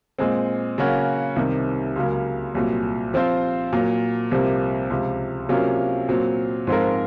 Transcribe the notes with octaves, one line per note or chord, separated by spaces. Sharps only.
A#2 G#3 C4
C#3 F#3 A#3 C#4 F#4
C2 C3 D#3
C#2 C#3 F#3 A#3
C2 A#2 F#3
F3 C4 F4 C5
A#2 F#3 A#3
C2 C3 F3 A#3
C#2 C3 F3
C3 F#3 A#3 C#4 F4
A#2 F#3 C4
G#2 F3 C4 F4 A#4